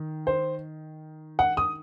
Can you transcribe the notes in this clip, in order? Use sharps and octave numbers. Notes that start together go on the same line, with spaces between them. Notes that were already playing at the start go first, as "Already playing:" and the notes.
Already playing: D#3
C5
F#5
D#6